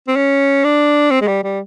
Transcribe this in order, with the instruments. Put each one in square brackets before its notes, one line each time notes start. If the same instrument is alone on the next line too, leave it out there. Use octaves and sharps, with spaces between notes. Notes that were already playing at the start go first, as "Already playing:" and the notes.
[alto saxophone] C4
C#4
D4
C4
G#3
G3
G3